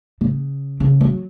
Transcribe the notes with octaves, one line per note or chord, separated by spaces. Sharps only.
C#3
C#3
F#3